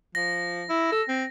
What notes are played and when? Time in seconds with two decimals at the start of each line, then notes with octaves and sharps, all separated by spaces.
0.15 F3 A#6
0.69 E4
0.92 A4
1.08 C4